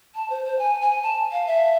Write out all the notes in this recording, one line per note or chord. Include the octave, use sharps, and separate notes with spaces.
A5
C5
C5
G#5
G#5
A5
F5
E5